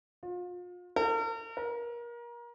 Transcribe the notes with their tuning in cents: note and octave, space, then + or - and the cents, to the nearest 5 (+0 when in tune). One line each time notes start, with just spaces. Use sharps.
F4 +35
A#4 -45
A#4 +30